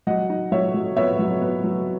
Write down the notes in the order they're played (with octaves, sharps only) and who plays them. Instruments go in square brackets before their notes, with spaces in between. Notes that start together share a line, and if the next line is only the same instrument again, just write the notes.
[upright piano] F#3 D#5 F#5
D#4
F#3 C#5 E5
F#3
B3 C#5 E5
F#3
B3
F#3